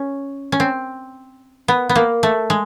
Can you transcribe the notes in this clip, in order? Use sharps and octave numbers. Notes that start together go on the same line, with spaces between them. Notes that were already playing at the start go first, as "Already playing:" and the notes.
Already playing: C#4
C#4
C4
B3
B3
A#3
A3
G#3